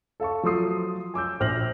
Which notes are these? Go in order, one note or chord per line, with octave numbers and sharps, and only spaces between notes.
A4 F5 A5 C#6
F3 F#3 A4 C6 D#6 C7
G#5 D6 E6 G6
A#1 C5 F6 G6 A#6 F#7